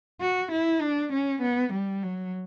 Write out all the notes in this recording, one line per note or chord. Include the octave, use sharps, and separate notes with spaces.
F#4
E4
D4
C#4
B3
G3
F#3